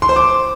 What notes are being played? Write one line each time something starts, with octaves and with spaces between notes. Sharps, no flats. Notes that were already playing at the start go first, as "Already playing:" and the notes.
C6
C5
D6